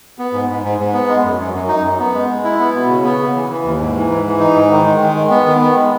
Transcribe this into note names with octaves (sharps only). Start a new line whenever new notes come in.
B3
G#2
G#2
G#2
G#2
B3
G#3
F#2
F#2
F#2
D#4
F#2
B3
G#3
G#3
E4
B3
B2
C#3
B3
C#3
E3
E3
D#2
G#2
E3
G#2
E3
D#4
G#2
D#3
G#3
D#3
G#3
B3
D#3
B3
G#3